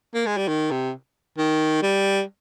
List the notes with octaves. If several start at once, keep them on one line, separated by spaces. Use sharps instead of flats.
A#3
G#3
G3
D#3
C3
D#3
G3